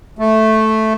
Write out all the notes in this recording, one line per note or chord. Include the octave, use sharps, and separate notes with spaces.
A3